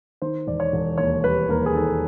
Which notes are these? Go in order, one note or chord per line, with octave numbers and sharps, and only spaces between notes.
D#3 C5
E1 D5
C#5
E1
D#2 C#5
G3 B4
D#2 A#4
G#4
D#3 A4